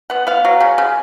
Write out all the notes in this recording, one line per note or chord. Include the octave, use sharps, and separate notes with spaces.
B3 F#5
B3 F5
F#3
C#3
C#3